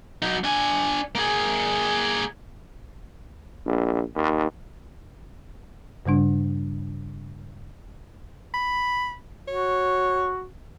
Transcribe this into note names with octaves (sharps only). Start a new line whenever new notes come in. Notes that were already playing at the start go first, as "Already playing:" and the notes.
F#3 D#4
D4 G#5
A#3 G#4
A#1
D#2
G2 C#3 G3 D4
B5
F#4 C#5